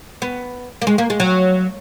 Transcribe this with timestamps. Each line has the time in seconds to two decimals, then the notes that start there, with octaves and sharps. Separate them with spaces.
0.22 B3
0.82 A#3
0.87 G#3
0.98 A#3
1.10 G#3
1.20 F#3